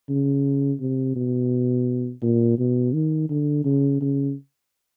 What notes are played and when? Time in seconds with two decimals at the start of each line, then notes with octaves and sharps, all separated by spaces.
0.09 C#3
0.80 C3
1.16 B2
2.23 A#2
2.59 B2
2.93 D#3
3.30 D3
3.65 C#3
4.01 C#3